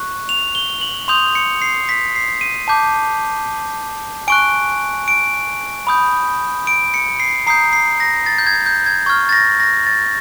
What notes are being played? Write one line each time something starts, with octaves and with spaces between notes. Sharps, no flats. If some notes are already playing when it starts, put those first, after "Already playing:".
Already playing: C#6 F#6
F7
G7
F#7
C6 D#6 G6 F7
C#7
C7
B6
C7
D#7
A5 D6 G6
G#5 C#6 F#6 D7
D7
B5 D#6 G6
D7
C#7
C7
A#5 D#6 G6 C7
C7
A#6
A6
G6
G#6
G6
G#6
C#6 F6 G#6
A6
A#6
A#6
A6